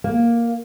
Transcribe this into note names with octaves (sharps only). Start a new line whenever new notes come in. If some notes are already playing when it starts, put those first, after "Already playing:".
A#3